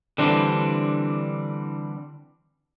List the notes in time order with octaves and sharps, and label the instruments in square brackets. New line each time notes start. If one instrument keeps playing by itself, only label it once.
[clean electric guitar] D3 E3 G3 C4 D4